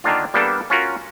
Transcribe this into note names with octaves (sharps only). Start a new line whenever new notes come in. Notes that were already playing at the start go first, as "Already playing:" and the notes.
D3 D#3 A#3 D4 F4
G3 A#3 B3 D4 A4
C#4 F4 F#4 A#4